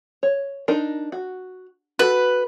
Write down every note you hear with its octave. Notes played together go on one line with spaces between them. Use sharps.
C#5
D4 D#4 A#4
F#4
F#4 A4 B4